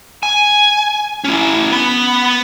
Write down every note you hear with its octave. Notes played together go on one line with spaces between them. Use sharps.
G#5
C#4 E4
B3 B5